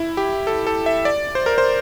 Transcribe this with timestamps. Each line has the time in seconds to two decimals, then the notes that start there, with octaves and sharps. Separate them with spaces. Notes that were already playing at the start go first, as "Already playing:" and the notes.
Already playing: E4
0.17 G4
0.47 A4
0.67 A4
0.86 E5
1.05 D5
1.35 C5
1.46 A#4
1.58 C5